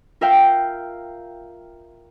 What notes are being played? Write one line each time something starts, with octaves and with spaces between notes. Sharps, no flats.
F4 A#4 E5 F5 G5